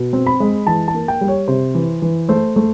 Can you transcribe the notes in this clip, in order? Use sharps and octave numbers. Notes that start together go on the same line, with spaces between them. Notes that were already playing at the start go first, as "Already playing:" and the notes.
Already playing: B2
C4
B5
G#3
E3 A5
A5
A#3
G5
G3
C#5
C3 C5
E3
E3
A3 C5
A3